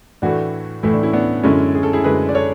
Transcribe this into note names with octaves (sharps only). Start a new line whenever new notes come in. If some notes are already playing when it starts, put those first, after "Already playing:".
A2 E3 A3 D4 F#4
A2 E3 A3 E4
D4
C#4 E4
B3 D4
F#2 D3 G#3 C#4 E4
G#4
A4
E4 G#4
F#2 D3 G#3 G#4 B4
D5
A4 C#5